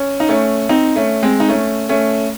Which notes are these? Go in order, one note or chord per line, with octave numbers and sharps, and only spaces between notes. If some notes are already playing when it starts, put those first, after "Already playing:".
Already playing: C#4
D#4
A3 C#4
C4 D#4
A3 C#4
G#3 C4
D#4
A3 C#4
A3 C#4